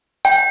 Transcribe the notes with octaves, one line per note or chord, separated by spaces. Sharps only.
G5